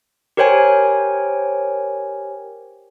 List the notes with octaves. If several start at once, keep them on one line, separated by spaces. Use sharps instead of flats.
G4 A#4 C5 C#5 G5 G#5